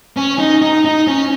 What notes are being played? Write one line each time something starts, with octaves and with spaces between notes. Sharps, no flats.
C#4
D#4
D#4
D#4
C#4